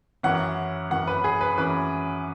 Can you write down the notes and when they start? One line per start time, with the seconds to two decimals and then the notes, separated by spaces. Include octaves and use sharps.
0.23 F#2 E3 C#4 F#5
0.90 F#2 E3 C#4 F#5
1.07 B4
1.24 G#4
1.41 B4
1.58 F#2 E3 C#4 B4